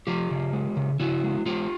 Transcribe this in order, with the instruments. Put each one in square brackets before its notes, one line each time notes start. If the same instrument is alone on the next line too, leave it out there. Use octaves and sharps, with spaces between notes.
[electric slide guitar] F3 F4 G4
C#3
G#3
C#3
C#3 E4 F#4
G#3
G#3 F4 G4